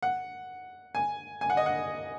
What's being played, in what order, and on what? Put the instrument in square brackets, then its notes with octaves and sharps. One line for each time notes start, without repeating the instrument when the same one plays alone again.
[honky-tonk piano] F#5
G#5
G#5
F#5
D#5
F#5